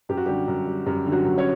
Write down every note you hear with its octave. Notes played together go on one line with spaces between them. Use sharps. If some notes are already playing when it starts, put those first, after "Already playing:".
F#2 G4
F#4
D3 G3 G4
F#2
G3
F#2 G3 G4
D3
F#3 F#4
F#2
C#4 C#5